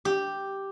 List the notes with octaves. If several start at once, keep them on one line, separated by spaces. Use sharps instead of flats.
G4